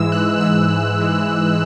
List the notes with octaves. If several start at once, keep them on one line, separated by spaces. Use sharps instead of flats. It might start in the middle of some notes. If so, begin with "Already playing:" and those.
Already playing: G#2 E3 G#3 E6
F#6
G#2 E3 G#3 E6
G#2 E3 G#3